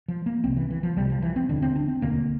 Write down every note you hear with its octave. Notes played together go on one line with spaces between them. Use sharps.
F3
A#3
C2 C3 C4
E3
E3
F3
C2 C3 G3
F3
E3
C4
E1 D2 D3 D4
C4
D4
C4
E1 D2 D3 A#3